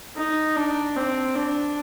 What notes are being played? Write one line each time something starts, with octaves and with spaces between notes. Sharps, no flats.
D#4
D4
C4
D4